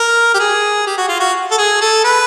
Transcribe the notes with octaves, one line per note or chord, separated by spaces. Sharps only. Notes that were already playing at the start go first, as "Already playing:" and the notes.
Already playing: A#4
G4
G#4
G4
F#4
F4
F#4
A4
G#4
A4
B4